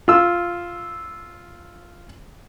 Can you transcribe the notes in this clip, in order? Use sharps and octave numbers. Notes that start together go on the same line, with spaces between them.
F4 E6